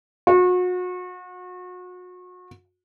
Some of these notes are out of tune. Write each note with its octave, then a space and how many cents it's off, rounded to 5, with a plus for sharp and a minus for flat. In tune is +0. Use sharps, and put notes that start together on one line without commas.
F#4 -35